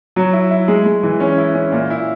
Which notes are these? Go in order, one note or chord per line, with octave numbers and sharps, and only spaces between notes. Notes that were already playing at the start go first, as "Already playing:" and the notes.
F#3
E4
E4
G#3
G#3
E3
C#4
E4
C#4
A#2
E4